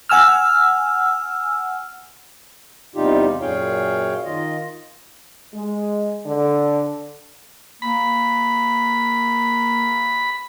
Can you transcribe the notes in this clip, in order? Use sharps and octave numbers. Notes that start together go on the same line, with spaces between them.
F#5 G#5 E6 F6
E2 C3 G3 D#4 F4 G4
F#2 A#2 G#4 C#5 F5 G5
D#3 F4 D#5
G#3
D3
A#3 B5